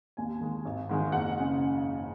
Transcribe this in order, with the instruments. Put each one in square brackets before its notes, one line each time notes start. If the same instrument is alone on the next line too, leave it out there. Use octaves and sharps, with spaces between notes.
[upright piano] D#2 G#5
D#3 G#3
G#1
G#2 D#3 G#3
F#1 F#5
C#3